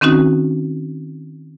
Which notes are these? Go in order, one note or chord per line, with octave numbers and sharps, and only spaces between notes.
D#3 C4 C#4 D#4 F#4